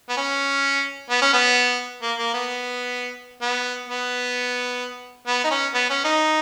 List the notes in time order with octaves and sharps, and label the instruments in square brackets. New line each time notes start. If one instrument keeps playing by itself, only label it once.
[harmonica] B3
C#4
B3
C#4
B3
A#3
A#3
B3
B3
B3
B3
D#4
C#4
B3
C#4
D#4